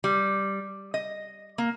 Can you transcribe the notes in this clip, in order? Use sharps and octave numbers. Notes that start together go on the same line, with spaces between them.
G3
D#5
A#3